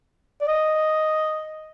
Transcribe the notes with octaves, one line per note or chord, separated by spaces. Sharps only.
D5
D#5